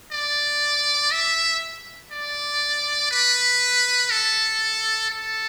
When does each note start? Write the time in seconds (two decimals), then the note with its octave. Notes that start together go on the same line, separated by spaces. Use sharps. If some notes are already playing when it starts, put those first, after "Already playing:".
0.12 D5
1.11 E5
2.11 D5
3.11 B4
4.10 A4
5.10 A4